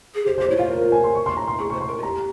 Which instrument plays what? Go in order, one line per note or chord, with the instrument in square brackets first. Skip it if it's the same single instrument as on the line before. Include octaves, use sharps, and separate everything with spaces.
[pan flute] G#4
[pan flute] G4 [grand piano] C5
[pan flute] G4 [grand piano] C5
[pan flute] E4 [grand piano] C#5
[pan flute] F4 [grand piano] F5
[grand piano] A#4
A#4
G#5
C6
C#6
C6
A#5
C6
[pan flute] G#4 [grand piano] C#6
[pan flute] C5 [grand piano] C#6
[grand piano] C6
[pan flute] A#4
F4
[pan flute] G4 [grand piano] A#5